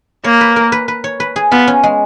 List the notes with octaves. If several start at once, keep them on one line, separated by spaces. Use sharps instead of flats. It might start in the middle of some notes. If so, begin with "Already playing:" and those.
A#3 C#5
B4
A#4
B4
B4
C#5
B4
G#4
B3 F4
C#4
G#3